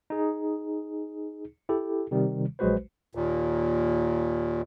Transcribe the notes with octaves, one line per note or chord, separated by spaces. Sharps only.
D#4 G#4
E4 G4 A4
C3 D#3 G3
A#1 F#3 G#3 F#4 B4 C5
D#2 A#2